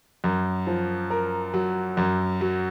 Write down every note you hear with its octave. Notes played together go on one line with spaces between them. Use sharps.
F#2
F3
A#4
F#3
F#2
F#3